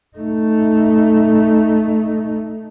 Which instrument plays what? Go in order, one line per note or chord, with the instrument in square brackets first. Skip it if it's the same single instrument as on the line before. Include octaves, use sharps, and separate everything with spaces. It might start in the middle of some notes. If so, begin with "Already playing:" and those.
[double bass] A3 D#4